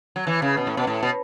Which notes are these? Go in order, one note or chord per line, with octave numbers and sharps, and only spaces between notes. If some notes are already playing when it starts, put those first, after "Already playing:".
F#3
E3
C#3
B2
A2
B2
A2
B2